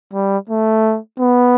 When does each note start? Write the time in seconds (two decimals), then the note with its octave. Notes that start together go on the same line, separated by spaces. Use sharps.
0.13 G3
0.49 A3
1.19 B3